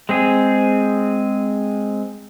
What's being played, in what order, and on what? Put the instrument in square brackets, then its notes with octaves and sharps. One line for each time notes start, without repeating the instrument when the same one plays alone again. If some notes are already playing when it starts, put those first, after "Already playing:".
[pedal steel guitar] G#3 C4 G#4